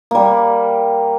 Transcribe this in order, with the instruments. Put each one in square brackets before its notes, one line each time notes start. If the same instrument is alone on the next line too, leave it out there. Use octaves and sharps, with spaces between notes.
[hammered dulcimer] G3 A#3